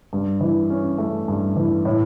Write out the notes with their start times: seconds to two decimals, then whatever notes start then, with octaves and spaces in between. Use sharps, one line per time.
0.13 G2
0.41 E3
0.70 C#4
0.98 A3
1.28 G2
1.56 E3
1.85 A2